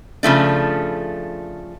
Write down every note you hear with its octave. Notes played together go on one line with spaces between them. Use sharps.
C#3 F3 A3 D4